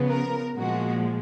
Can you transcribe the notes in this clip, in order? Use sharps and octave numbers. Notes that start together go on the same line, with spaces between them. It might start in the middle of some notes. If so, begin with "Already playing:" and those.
Already playing: C#3 F3 B3
A#4
A#2 F3 G#3 F#4